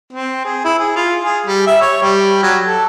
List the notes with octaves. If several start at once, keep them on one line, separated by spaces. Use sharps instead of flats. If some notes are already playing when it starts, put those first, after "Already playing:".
C4
G#4
E4
G#4
F4
G#4
G3
E5
C#5
G3
F#3
A4